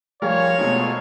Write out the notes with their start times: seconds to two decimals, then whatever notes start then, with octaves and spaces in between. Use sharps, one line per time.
0.22 F3 G3 G4 G#4 A#4 C#5 F5
0.59 G#1 B2 A3 F4 G#4